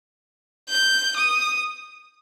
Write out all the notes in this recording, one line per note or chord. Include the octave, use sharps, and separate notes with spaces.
G6
D#6